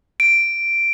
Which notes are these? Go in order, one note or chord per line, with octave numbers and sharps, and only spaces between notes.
D7